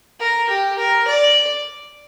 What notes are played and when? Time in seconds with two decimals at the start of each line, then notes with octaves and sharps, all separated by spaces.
0.20 A#4
0.49 G4
0.78 A#4
1.08 D5